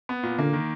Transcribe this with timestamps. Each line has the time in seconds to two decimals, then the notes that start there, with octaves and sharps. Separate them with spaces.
0.09 B3
0.23 A#2
0.38 D3 A#3
0.53 D#3